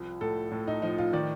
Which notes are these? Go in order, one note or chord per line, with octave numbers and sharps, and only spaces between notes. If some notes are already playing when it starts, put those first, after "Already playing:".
Already playing: C2 F3
A2 A4
A2
D#4
F3 D#4
F4
D#3 D5